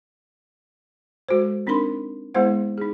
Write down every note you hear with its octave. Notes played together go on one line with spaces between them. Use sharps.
G#3 F#4 A4 C5
C4 D4 D#4 A#4 B5 C6
G#3 B3 E4 G#4 C5 F#5
D#4 G#4